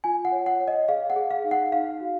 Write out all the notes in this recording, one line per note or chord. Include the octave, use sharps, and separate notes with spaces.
F4 G#5
F#5
C#5
F#5
C#5
D#5
G#4 F5
F#5
G#4
F5
D#4
F#5
D#4 F5
F#4